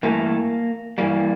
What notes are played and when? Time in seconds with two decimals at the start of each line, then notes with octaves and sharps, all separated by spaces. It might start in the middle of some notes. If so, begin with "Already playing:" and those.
0.03 G2 E3 A3 A#3
0.98 G2 E3 G3 A#3